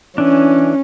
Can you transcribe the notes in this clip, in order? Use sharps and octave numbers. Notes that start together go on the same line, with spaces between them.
E3 C#4 D4